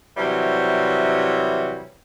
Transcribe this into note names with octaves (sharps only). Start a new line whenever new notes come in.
C3 E3 F#3 G3